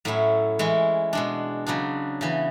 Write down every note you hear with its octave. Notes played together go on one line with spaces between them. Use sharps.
A2 F#3 C#4 E4
E3 G#3 C#4 E4
B2 G#3 D4
C#3 F#3 B3 D4
C#3 E3 B3